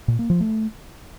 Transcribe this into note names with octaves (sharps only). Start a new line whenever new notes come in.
A#2
A#3
F3
A3